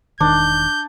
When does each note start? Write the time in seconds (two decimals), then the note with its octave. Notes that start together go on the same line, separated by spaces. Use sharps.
0.20 E1 D#3 D4 G6